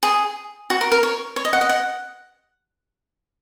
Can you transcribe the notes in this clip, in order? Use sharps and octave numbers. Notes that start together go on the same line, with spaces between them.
G#4
F#4
A#4
A#4
C#5
C#5
D#5
F#5
D#5
F#5